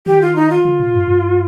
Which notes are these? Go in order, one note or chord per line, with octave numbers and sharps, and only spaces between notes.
D#3 G4
F4
D#4
F4
D3
A#2
G2
G2